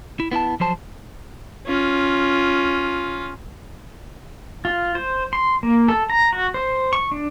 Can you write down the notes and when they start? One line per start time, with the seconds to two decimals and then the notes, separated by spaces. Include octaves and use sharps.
0.20 E4
0.32 B3 E4 F#5 A5
0.60 F3 F#3 C5 A5
1.66 C#4 F4
4.65 F4
4.95 C5
5.33 C6
5.63 A#3
5.88 A4
6.10 A#5
6.33 F#4
6.54 C5
6.93 C#6
7.12 D4